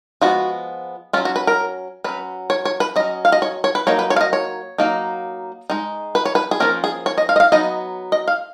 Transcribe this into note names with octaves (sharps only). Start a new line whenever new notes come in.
F3 G#3 B3 F#4
F#3 C#4 F4
F#4
B4
A#4
F#3 C#4 B4
C#5
C#5
B4
F#3 C#4 D#5
F5
D#5
C#5
C#5
B4
F#3 A#3 D#4 C#5
B4
C#5
F5
D#5
C#5
F#3 A#3 D#4
G#3 D#4
B4
C#5
B4
G#4
F3 A#3 C#4 A#4
G#4
C#5
D#5
F5
D#5
F5
F#3 B3 D#4 D#5
D#5
F5